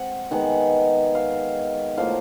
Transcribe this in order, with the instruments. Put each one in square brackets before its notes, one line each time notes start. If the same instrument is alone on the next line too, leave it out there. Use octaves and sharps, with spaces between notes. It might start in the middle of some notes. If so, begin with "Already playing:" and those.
Already playing: [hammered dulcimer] G#3 C4 F#5
D#3 G#3 B3 F#5
F5
A2 F3 A#3 F5